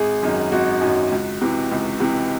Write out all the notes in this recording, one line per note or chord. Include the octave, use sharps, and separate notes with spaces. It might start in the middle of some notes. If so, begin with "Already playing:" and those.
Already playing: G#1 G#4
F#2 D#3 F#3
G#1 F#4
F#2 D#3 F#3
C#2
C3 E3
C#2
C3 E3